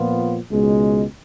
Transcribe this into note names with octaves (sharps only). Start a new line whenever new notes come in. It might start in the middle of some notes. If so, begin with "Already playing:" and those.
Already playing: A#2 F3 B3 F4
C#2 B2 G#3